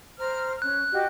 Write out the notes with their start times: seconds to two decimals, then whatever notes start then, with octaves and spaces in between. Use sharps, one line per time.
0.18 C5 A#5 F6
0.62 C#4 F#6
0.92 F#4 G4 D#5